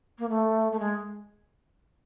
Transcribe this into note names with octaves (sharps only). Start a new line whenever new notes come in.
A#3
A3
A3
G#3